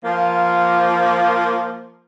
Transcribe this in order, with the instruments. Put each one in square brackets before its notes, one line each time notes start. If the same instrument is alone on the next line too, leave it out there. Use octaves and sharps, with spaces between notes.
[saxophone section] F3 A#3